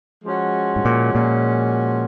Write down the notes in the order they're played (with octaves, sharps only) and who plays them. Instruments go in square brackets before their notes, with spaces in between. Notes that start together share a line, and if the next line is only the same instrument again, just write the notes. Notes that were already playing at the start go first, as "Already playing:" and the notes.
[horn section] F3 G#3 C#4 F#4
[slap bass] G#2
A#2
A#2